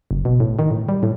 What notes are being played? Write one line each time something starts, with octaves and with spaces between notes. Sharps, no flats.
F#1
B2
A2
D#3
A2
G3
A2